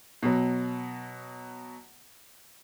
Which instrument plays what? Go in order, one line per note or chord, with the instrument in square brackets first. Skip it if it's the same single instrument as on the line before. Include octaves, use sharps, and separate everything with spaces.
[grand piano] B2 F#3